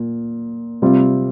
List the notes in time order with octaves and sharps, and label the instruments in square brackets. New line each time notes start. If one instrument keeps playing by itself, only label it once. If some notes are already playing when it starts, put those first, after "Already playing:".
Already playing: [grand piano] A#2
C3 G3 C4 F4